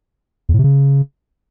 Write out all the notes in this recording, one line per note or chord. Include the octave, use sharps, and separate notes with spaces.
E2
A2
C3
C#3